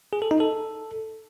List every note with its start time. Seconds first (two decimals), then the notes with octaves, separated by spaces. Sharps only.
0.13 G#4
0.22 A4
0.31 D#4
0.40 A4